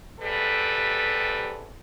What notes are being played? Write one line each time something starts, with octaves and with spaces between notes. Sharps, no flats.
E2 C3 G3 A4 B4